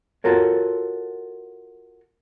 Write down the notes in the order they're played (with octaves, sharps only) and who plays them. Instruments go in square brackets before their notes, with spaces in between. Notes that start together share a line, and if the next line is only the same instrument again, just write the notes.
[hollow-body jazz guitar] F4 F#4 A4 A#4 C#5